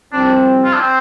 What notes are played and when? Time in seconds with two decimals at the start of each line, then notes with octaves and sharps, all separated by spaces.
0.13 C2 C3 F3 C4 D4
0.64 F4
0.73 D4
0.81 C4